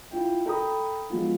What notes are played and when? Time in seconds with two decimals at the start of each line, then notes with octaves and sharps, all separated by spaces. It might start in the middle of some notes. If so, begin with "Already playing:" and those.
0.11 E4 F4 G5
0.46 A4 G5 A#5 B5 D#6
1.10 F3 F#3 G#3 B3 F4